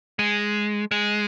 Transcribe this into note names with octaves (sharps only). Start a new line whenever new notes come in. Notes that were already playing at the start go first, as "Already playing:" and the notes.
G#3
G#3